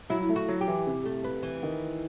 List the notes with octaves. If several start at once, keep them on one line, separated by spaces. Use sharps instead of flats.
F#3 E4
A3
F#4
F#3
G4
E3
C3
A3
B3
E3
D#3